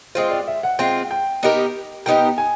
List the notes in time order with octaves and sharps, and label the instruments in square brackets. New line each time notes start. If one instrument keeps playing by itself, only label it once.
[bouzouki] G#3 C4 F4 [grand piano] C5
[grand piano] D5
E5
F#5
[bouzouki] G#3 C4 F4 [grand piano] G5
[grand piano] G5
[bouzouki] B3 D#4 G4 A#4
[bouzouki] B3 D#4 G4 A#4 [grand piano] G5
[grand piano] G#5